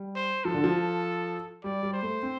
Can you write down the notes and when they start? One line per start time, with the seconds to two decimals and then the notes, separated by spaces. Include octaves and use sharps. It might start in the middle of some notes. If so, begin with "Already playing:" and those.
Already playing: G3
0.15 C5
0.45 F3 A4
0.54 D3
0.64 F3
1.64 G3 D5
1.83 G3
1.94 C5
2.03 A3
2.23 C4